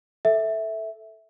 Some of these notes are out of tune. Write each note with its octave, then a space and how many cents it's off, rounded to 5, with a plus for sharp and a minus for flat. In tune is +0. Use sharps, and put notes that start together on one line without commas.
A4 +0 E5 -10